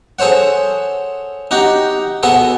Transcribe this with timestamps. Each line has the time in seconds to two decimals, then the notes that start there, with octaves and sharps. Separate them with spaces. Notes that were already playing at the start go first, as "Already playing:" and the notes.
0.19 G#4 A4 C5 C#5 F#5
1.51 D#4 F#4 G4 F#5 A#5
2.23 B2 B3 F#4 G#4 A4